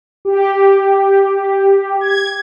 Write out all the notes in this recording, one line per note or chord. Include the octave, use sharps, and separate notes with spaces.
G4
G#6